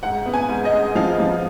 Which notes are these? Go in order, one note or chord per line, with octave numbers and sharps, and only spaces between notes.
G#2 F#5
B3
G#5
G#2
D#5
G#3
F3 F5
F3